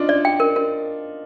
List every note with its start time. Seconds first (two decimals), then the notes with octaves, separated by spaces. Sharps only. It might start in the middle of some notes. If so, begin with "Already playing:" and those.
Already playing: D4 D#4 F4
0.09 D5
0.25 G5
0.40 A#4
0.56 A#4